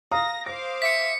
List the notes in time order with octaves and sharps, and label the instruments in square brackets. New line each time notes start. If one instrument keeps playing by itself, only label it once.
[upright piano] F5 A#5 D#6 [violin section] A#6
[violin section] C5 F5 D6 [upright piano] A#6
[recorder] E5 [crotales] B6 C#7